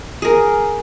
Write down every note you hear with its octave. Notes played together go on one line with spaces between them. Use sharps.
G#4 A#4